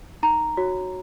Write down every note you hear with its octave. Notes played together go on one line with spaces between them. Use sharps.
D#4 A#5
F#4 C#5